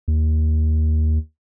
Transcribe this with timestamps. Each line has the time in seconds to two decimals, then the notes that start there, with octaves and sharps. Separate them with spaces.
0.08 D#2